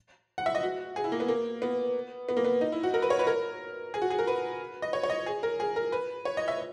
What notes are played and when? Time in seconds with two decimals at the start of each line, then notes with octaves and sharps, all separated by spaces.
0.38 F#5
0.46 E5
0.55 D#5
0.63 F#4
0.96 G#4
1.04 E4
1.12 A#3
1.20 B3
1.29 A#3
1.62 B3
2.29 B3
2.37 A#3
2.45 B3
2.61 D#4
2.72 E4
2.83 F#4
2.94 A#4
3.02 B4
3.10 C#5
3.19 B4
3.27 A#4
3.94 G#4
4.02 F#4
4.10 G#4
4.19 A#4
4.27 B4
4.82 D#5
4.93 C#5
5.03 C#5
5.10 D#5
5.26 G#4
5.43 A#4
5.60 G#4
5.76 A#4
5.92 B4
6.25 C#5
6.37 D#5
6.48 E5